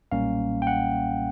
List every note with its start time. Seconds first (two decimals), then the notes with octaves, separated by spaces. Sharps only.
0.12 B1 A#2 G3 A#3 C#4 F5
0.62 G5
0.67 F#5